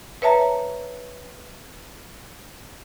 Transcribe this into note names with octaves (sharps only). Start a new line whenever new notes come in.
B4 C#5 E5 A5 A#5